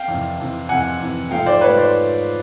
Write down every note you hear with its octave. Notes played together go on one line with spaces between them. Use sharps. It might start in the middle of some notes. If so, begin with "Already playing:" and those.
Already playing: F5 G5
F2 C3 E3
F2 C3 E3
F2 C3 E3 F#5 G#5
F2 C3 E3
G#2 F3 A3 F5 G5
C5 D5
G#2 F3 A3 B4 C#5
C5 D5